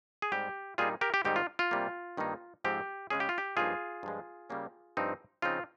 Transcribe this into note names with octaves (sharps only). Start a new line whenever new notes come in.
G#4
G#2 G3 C4 G4
A#2 G3 A#3 D#4 F4 G#4
G4 A#4
G4
G#2 D#3 G3 C4 D#4 G4
F4
F4
C3 G3 A#3
G2 D#3 A#3 D#4
G#2 F3 C4 G4
C#3 G#3 C#4 G#4
G4
F4
G4
G2 F3 A#3 D#4 F4 G#4
G2 F3 G#3
C#3 G3 A#3 C#4
G2 F3 C4 D#4
C#3 F3 C4 D#4 F4